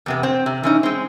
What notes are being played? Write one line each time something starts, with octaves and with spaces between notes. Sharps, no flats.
E2 C3 B3
C4
C3
E3 C#4 D#4
G#3 C4